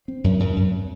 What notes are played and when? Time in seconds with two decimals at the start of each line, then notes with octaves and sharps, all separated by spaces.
0.08 C4
0.24 F#2
0.40 F#2
0.56 F#2